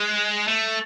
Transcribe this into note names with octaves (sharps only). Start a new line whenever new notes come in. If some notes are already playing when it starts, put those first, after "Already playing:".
Already playing: G#3
A3